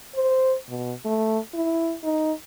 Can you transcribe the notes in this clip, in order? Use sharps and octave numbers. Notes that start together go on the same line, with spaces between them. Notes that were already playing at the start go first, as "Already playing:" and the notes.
C5
B2
A3
E4
D#4